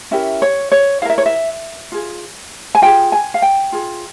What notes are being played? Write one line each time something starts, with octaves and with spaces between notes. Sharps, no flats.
C#4 E4 G4 A#4 E5
C#5
C#5
E4 A#4 E5 F5
C#5
E5
F4 G#4
G#5
F4 G#4 G5
G#5
F5
G5
F4 G#4